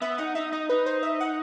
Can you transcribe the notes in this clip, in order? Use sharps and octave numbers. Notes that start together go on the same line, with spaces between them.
B3 E5
D#4 F#5
D#4 E5
D#4 D#5
D#4 B4
C5
E5
F#5